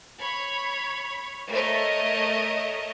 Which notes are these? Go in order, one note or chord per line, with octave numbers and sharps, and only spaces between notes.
C#5 B5
A3 A#4 C#5 D#5